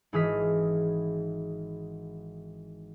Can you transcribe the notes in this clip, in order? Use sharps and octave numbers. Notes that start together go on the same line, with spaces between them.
G#1 E3 G#4 D#6 F6 B6